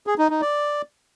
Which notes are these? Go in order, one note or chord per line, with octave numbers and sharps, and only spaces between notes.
G#4
D#4
D#4
D5